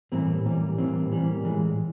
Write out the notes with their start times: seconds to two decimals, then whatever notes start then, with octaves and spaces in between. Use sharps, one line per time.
0.12 A2 E3 G3 A#3 C4
0.45 A2 E3 G3 A#3
0.78 A2 E3 G3 A#3 C4
1.11 A2 E3 G3 A#3
1.44 A2 E3 G#3